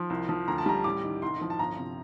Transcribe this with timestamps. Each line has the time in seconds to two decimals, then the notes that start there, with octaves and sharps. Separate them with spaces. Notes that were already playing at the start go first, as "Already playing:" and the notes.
Already playing: F3 C6
0.10 C2
0.29 F3
0.48 D2 A#5
0.58 A5
0.66 G3 A#5
0.84 A1 D6
1.03 D#3
1.22 C2 C6
1.41 F3
1.50 A5
1.59 G1 A#5
1.78 C3